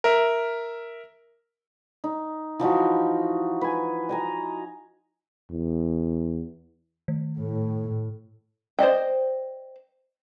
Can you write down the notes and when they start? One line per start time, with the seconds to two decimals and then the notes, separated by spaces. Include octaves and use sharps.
0.04 A#4 E5
2.04 D#4
2.59 E3 F3 D#4 F#4
3.61 B4 G#5
4.09 D#5 G#5 A#5
5.50 E2
7.08 D#3
7.39 A2
8.79 C5 D5 D#5 G5